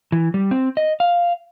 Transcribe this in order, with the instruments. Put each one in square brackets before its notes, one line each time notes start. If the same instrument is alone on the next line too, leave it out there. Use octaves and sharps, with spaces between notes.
[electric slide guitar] E3
G3
C4
D#5
F5